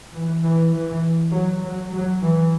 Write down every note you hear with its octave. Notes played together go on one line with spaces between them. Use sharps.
E3
E3
E3
F#3
F#3
F#3
E3